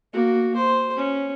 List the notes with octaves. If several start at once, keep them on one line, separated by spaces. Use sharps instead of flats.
A#3 F#4
C5
C#4